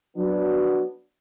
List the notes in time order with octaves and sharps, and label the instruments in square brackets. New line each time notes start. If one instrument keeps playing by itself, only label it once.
[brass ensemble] F#3 B3 D4